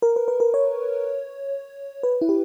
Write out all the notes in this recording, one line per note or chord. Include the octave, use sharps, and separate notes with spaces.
A#4
B4
B4
A#4
C#5
B4
E4
G4